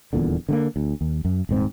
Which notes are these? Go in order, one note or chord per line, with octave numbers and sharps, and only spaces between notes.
D#1 E2 A#2 D3
D3 A3 A#3
D2
D#2
F#2
D#1 G#2 C4